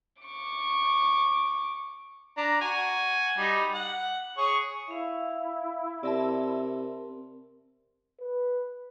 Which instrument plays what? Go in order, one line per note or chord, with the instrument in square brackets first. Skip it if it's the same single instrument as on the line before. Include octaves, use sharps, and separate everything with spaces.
[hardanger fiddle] C#6 D6
[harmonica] D4 A#5
F#4 G#5
G3 D#4
F#5
G#4 C#5
[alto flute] E4 [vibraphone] E5 F5
[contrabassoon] C3 [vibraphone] C4 A#4 [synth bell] D5 E5 A5
[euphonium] B4